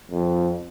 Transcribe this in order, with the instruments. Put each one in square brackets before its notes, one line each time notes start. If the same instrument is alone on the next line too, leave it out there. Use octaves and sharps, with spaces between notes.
[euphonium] F2